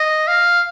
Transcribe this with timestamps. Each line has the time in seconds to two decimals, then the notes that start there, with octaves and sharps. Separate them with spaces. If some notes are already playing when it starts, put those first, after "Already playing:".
Already playing: D#5
0.28 F5